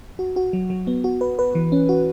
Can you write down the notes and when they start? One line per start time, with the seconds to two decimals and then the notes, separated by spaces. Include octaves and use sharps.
0.19 F#4
0.36 F#4
0.53 F#3
0.70 F#3
0.87 B3
1.04 F#4
1.21 B4
1.39 B4
1.55 E3
1.72 C#4
1.89 F#4